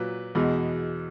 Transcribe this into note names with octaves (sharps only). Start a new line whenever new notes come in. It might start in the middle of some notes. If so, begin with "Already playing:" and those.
Already playing: A#2 F#3 B4
E2 B2 G#3